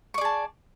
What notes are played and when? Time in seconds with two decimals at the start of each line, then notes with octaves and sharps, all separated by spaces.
0.14 C#6
0.18 D5
0.21 G#4
0.25 A5